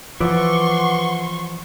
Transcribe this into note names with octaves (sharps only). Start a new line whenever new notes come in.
E3 F3 B4 D5 F#5 C6 C#6 E6